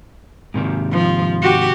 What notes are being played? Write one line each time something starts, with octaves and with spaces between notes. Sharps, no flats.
G#2 C3 D#3
F3
F#4 G4